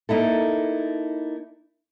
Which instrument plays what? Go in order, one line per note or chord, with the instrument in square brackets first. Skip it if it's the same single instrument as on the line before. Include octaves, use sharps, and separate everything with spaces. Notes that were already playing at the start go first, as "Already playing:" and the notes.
[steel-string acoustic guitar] A#3 D#4 E4 A4